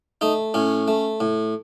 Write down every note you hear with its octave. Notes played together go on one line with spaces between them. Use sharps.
A3 D#4
A2 C#4
A3
A2